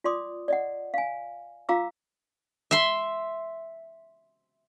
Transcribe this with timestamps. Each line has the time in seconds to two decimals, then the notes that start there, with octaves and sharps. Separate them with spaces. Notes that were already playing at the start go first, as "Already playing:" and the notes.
0.04 F4 D5 C6 D6 D#6
0.48 D5 D#5 F#5
0.94 F5 G#5
1.69 F4 F5 A#5 D6 E6
2.71 E5 C6